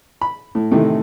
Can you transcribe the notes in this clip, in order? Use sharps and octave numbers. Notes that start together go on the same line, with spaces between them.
B5
A2
A2 C3 D#3 E3 A3